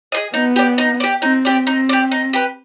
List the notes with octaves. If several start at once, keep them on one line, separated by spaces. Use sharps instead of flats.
G#4 C5 D#5
B3 D#4
G4 D5
D#4
G4 D5
C4 D#4
G4 D5
C4 D#4
G4 D5
D#4
G4 B4